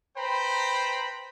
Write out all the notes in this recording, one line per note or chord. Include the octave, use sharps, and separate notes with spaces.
B4 C5 G5 A#5 B5